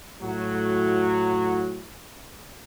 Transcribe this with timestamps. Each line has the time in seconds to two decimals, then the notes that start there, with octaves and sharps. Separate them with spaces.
0.22 A2 F#3 F#4